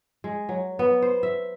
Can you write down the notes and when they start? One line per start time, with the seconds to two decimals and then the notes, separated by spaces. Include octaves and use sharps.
0.24 G#3
0.49 F#3
0.79 B3
1.02 C5
1.23 E5